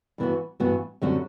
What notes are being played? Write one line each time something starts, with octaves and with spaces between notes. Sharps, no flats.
G2 E3 B3 F#4
G2 E3 B3 F#4
F#2 D3 G3 C4 F#4